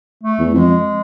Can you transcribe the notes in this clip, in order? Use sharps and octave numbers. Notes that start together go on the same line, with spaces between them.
A3
E2
F2 G#3